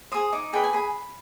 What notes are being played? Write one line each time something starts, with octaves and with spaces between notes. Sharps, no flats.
G#4 C5 D#6
D#4 D6
G#4 B4 G5
G#5
G#4 B5